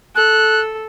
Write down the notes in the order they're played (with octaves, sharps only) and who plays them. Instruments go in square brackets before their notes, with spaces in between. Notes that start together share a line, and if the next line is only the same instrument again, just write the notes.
[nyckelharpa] A4 [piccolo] F#6